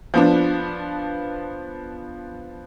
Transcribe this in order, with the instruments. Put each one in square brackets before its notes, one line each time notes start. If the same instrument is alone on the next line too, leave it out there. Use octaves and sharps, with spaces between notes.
[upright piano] F3 B3 D4